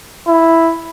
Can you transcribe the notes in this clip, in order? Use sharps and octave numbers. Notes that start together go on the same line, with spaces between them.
E4